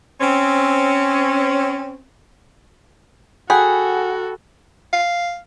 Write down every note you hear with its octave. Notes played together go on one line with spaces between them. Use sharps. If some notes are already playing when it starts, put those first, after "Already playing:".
C4 C#4
F#4 G#4 A4 F#5 G5 B5
F5